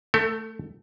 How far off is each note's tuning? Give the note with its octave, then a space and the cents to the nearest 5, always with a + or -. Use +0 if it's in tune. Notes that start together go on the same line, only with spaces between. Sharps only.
A3 +0 A4 +35